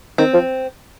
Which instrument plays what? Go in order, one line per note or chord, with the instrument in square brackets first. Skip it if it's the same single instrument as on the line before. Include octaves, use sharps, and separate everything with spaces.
[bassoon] D#3 [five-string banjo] C4
[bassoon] F3